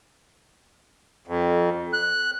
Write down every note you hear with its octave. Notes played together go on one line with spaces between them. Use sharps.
F2
F#6